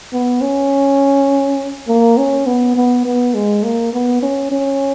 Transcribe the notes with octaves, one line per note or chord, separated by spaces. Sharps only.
B3
C#4
A#3
C#4
B3
B3
B3
G#3
A#3
B3
C#4
C#4